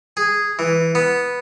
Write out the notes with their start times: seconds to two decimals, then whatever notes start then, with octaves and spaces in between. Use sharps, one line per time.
0.17 G#4
0.59 E3
0.95 B3